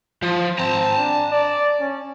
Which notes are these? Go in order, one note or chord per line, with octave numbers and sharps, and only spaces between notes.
F3
C4 A5 A#5
D4
D5
C#4